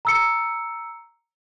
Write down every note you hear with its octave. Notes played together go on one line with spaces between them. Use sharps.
A#5 E6 C#7